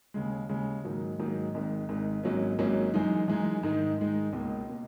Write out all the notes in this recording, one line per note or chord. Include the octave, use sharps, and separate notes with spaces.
D#2 C#3 G#3
D#2 C#3 G#3
G#2 D#3 F#3 A#3
G#2 D#3 F#3 A#3
G#1 G#2 D#3
G#1 G#2 D#3
G#1 G#2 F#3 A#3 C#4
G#1 G#2 F#3 A#3 C#4
F#2 E3 G#3 D#4
F#2 E3 G#3 D#4
G#2 D#3 G#3 D#4
G#2 D#3 G#3 D#4
C#2 B2 A#3
B2 A#3